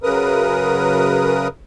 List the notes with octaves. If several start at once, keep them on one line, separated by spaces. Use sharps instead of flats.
F#2 C#3 A#4 B4 D#6